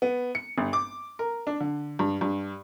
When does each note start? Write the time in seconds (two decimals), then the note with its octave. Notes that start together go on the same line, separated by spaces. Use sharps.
0.02 B3
0.35 C#7
0.58 G1
0.73 D6
1.19 A#4
1.47 D4
1.60 D3
1.99 G2
2.21 G2